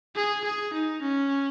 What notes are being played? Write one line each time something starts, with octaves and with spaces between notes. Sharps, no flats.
G#4
G#4
D#4
C#4